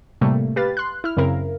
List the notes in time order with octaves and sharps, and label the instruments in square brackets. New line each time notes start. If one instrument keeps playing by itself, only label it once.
[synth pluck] A2 C3 G3 A3 A#3
G4 B4 F5 A6
C6 F#6
E4 F6
F#2 C#3 C4 E4 A#4 F5